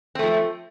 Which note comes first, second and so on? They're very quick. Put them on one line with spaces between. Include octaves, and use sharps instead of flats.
C4 A3 F3